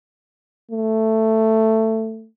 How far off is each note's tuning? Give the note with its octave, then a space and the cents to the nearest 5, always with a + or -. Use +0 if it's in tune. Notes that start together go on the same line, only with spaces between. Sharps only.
A3 +10